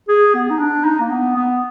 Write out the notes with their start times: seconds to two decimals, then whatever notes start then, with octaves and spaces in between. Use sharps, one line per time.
0.09 G#4
0.35 B3
0.51 D#4
0.59 D4
0.85 D#4
1.00 A#3
1.10 B3
1.36 B3